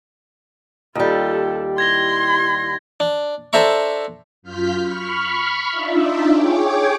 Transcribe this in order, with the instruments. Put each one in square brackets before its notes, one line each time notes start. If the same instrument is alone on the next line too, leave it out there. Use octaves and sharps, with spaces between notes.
[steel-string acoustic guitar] D#2 G3 [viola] F4 A4
[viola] E4 C6 [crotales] G#6 A#6 G7
[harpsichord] D4
D4 A4 C5 E5 A#5 C#6
[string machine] F#2 F4 F6 G6 B6
B5 C#6 F6
D4 D#4 F4 E5
G#4 C#5 G5 D6